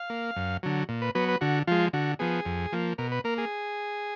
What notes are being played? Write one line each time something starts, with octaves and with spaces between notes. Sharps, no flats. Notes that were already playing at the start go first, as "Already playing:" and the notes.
Already playing: F5
A#3
F#2
D3 F#3
A#2
B4
F#3 B3 B4
B4
D3 F#4
F3 G#3 F4
D3 F#4
F3 B3 G#4
F2
F3 A#3
B2 A#4
B4
A#3 A#4
G#4